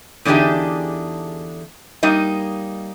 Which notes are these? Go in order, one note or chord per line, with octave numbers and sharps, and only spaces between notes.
E2 D3 D4 D#4 G4 G#4
G3 A#3 D#4 D#5